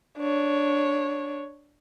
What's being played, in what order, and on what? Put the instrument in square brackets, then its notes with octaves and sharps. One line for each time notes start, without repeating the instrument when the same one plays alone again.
[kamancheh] D4 C#5